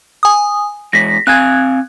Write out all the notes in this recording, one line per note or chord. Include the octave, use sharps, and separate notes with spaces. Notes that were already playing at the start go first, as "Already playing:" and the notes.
G#5 D#6
E3 G#3 A#6 B6
C4 F5 G#5 F#6 G#6